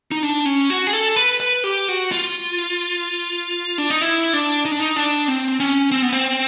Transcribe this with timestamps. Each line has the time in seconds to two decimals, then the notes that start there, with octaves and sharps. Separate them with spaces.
0.11 D#4
0.23 D4
0.45 C#4
0.70 F#4
0.87 G#4
0.93 A4
1.16 B4
1.40 B4
1.64 G4
1.88 F#4
2.12 F4
3.78 D4
3.90 D#4
4.02 E4
4.33 D4
4.65 D#4
4.71 D4
4.80 D#4
4.96 D4
5.28 C4
5.60 C#4
5.91 C4
6.02 B3
6.13 C4